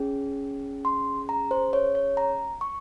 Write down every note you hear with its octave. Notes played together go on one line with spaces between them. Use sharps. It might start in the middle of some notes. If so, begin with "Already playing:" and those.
Already playing: C#4 G#4
C6
A#5
C5
C#5
C#5
A#5
C#6